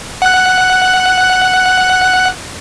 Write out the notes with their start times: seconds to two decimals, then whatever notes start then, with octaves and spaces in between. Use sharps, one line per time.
0.22 F#5 F#6